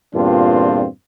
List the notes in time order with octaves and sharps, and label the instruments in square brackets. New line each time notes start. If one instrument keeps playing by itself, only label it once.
[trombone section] E2 G2 A#2 C4 D4 F4